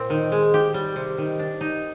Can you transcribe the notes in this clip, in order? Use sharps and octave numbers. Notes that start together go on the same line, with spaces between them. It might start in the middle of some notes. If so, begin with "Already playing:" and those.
Already playing: A#2 C4
D#3
G#3
G4
G3
C3
D#3
D4
D#4